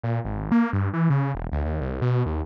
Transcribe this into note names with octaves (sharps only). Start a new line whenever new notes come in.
A#2
G#1
A#3
G2
E3
C#3
E1
D2
D#2
C2
B2
D#2